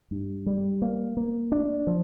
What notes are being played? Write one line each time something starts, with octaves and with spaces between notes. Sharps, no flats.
G2
G3
A#3
A#3
D4
F3